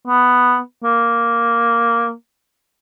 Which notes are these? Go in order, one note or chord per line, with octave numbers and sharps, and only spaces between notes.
B3
A#3